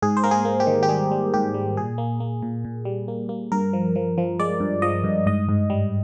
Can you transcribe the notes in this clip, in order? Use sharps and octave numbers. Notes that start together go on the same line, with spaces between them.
G#2 G#4
C5
A#3 A#4
G#4
A#3
G4
D#3
G4
G3 G#4
G3
G#2 G4
G3
A#2 G#4
A#3
A#3
A#2
A#2
G3
A#3
A#3
G2 A#4
F3
F3
F3
G#3 D5
G2
F3 D#5
G2
G#2 D#5
G#2
G3